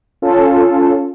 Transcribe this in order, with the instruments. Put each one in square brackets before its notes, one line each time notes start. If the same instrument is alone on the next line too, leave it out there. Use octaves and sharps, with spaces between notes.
[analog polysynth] C#4 F4 A4